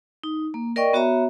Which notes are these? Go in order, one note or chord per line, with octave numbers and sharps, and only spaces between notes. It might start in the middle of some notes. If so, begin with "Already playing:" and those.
D#4
A#3
A#4 D5 D#5 G5 C#6
B3 F#4 C#5 E5 A#5